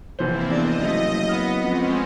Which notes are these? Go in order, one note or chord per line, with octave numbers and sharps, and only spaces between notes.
F1 E3 A#3 C4 E4 C5
E2 D4 D#5
F#1 A3
B3 F6
F2 G#3 C4 C#4